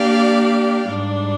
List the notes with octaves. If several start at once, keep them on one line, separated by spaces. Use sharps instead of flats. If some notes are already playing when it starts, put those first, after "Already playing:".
Already playing: A#3 D4 G4 D5 F5
G#2 G3 D4